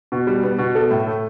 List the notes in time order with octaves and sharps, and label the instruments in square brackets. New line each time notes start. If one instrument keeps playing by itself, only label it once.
[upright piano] B2
G3
B3
B2
A4
A2
A3